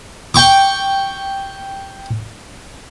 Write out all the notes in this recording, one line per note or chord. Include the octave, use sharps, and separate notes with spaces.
G5 C#6 D6